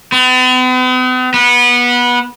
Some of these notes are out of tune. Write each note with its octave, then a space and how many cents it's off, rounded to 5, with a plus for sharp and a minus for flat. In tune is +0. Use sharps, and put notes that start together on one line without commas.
B3 +45
B3 -20